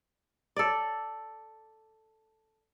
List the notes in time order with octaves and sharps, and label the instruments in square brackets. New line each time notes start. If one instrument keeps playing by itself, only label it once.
[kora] A4 D5